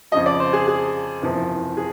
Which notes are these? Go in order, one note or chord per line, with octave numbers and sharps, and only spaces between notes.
F2 C#3 F3 D#5
D5
C5
G#4
G#4
F#1 E2 C3 F3
G#4